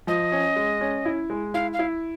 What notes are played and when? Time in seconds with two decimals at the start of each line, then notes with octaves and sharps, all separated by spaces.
0.07 F3 D#5
0.32 C#4
0.56 G#3
0.81 C#4
1.05 E4
1.30 G#3
1.54 E4 F5
1.73 F5
1.79 E4